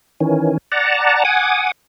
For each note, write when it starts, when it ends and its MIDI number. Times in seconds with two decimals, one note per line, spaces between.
0.20 0.58 51
0.20 0.58 52
0.20 0.58 61
0.72 1.24 74
0.72 1.24 78
0.72 1.24 81
0.72 1.24 82
1.25 1.71 78
1.25 1.71 80
1.25 1.71 86
1.25 1.71 87